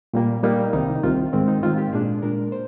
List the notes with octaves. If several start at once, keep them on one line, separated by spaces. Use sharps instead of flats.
A#2 G3 A#3
A#2 G3 A#3 D#4
C2 C3 D#3 D#4
C2 C3 D#3 F4
G#2 D#3 G#3 C4
D#4
G#2 D#3 G#3 C4 F4
G4
A#2 G#3 D4 G#4
A#2 G#3 D4 A#4
C5